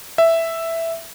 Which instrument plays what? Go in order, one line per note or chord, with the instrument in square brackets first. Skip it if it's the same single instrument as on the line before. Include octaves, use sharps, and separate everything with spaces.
[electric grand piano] E5